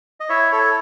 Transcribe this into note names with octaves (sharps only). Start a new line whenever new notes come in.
D#5
E4 C#5 E5
A4 C#5